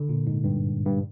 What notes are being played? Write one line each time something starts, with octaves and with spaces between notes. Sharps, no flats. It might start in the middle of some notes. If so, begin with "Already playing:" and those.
Already playing: D3
A#2
G#2
G2
G2